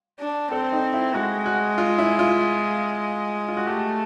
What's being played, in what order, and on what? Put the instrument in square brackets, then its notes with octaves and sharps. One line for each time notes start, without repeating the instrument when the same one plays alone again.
[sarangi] D4
[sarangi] C4 [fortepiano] A4
[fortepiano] D#4
E4
[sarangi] G#3 [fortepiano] F#4
[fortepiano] F#4
F4
E4
F4
F4
F#4
[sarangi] A3 [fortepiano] G4